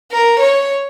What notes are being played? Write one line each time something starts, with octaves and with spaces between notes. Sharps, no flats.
A#4
C#5